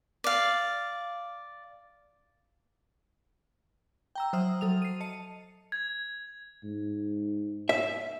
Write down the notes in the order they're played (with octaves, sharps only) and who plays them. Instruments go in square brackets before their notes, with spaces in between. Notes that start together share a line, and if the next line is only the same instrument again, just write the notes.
[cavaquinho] D5 F5
[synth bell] G5 A#5 E6
F#3 C5 E5 D#6 F6
F#3 A4 D#6 F7
C7 D#7
D#5 A5 C#7 D#7
[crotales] G#6
[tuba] G#2
[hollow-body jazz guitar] E5